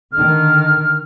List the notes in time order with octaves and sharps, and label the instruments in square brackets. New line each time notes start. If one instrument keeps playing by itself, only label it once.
[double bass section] D3 D#3 [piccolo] F6